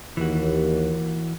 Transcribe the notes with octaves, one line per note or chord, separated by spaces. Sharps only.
D#2 E3 F#4